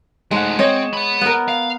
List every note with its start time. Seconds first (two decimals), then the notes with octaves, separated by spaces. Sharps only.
0.31 G#3 A3 D#4 F#5
0.59 C4 C#5 D#5
0.93 F#5 B5
1.21 B3 A#4
1.48 F5